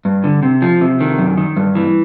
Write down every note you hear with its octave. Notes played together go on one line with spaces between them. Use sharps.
G2
D3
C3
F3
C3
D#3
F#2
D#3
G2
E3